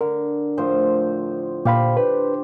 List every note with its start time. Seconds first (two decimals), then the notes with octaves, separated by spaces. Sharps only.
0.01 D3 A#4
0.57 A2 F3 C5
1.65 A#2 G4 C5 F5 B5
1.97 D4 B4